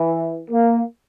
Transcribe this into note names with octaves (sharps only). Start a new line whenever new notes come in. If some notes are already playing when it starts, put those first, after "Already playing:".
Already playing: E3
A#3